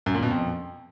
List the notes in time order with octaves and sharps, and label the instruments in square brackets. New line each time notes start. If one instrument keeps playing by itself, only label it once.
[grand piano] F#2
A#2
B2
F2